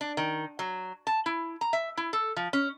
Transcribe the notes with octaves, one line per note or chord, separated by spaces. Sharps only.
D4
D#3
F#3
A5
E4
A#5
E5
E4
A4
F3
C#4